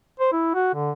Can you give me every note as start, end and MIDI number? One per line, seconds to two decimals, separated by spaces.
0.20 0.31 72
0.32 0.52 64
0.54 0.72 66
0.75 0.91 50